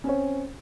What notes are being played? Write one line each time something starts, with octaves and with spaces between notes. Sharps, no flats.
C4 C#4 C#5